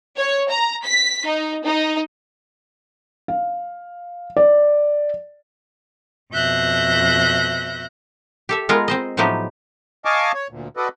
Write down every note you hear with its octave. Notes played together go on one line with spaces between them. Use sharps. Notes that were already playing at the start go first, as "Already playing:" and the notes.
C#5
A#5
B6
D#4
D#4
F5
D5
F2 B2 E5 F#6 G6 A#6
G4 A4 E5
G#3 B3 F4 A#4
C4 C5 D#5
A2 F3 F#3 B3 D#4 G4
D#5 F5 G#5 A5 C#6 D6
C#5
D2 A#2
F#4 A4 B4 D5 D#5